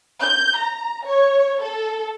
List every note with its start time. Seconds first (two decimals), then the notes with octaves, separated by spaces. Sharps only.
0.22 G6
0.57 A#5
1.05 C#5
1.61 A4